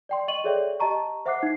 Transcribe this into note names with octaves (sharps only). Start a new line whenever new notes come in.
D5 G5 C6
D#5 G5 C#6 D#7 F#7
G#4 A4 C#5 D5 E5 G5
G4 D#5 A5 A#5 C#6
C5 E5 F#5 D6 F#6 C7
D#4 C7